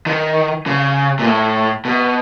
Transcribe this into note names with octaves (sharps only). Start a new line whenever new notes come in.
D#3
C#3
A#2
A2
B2